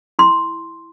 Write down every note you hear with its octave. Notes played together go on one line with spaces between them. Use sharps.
E4 C6